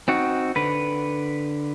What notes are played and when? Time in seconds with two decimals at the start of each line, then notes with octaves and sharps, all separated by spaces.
0.08 C4 D#4 F#4
0.56 D3 B4